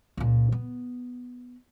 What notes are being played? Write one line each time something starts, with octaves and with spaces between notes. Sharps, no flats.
C#2 A#2
B3